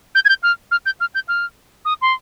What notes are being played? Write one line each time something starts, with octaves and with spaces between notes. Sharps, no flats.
G6
G#6
G6
F6
F6
G6
F6
G6
F6
D#6
C6